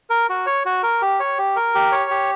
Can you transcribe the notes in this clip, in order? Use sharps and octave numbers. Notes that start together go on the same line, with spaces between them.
A#4
F#4
C#5
F#4
A#4
G4
C#5
G4
A#4
G4
C#5
G4